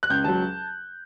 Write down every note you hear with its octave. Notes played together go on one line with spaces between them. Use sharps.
F#6
C#2 G6
C#3 F#3 A5